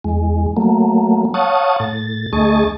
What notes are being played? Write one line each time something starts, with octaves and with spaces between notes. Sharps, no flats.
E2 G#3
F#3 A3 A#3
C#5 F5 F#5 A5 C#6 D#6
A2 A6
D2 A3 G#4 D#5 C#6 A6